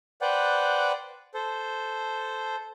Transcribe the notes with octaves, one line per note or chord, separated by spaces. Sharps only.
B4 C5 D5 F#5 G5
A4 C5